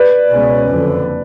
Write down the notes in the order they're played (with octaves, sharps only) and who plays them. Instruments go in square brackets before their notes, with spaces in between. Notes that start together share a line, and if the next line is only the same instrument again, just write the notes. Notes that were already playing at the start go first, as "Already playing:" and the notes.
Already playing: [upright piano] B4 D5
[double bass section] C#2 B2 G#3 C#4
F#1 F2 D3